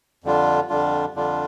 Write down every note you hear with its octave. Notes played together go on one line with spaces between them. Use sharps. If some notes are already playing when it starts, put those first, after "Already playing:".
F2 D3 G3 D4 F4
F2 D3 G3 D4 F4
F2 D3 G3 D4 F4